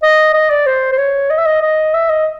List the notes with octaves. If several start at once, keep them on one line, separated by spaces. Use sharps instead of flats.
D#5
D#5
D5
C5
C5
C#5
D#5
E5
D#5
D#5
E5
D#5